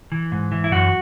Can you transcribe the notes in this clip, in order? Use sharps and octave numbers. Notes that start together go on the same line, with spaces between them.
E3
G#2
E3
E4
F#2 F#4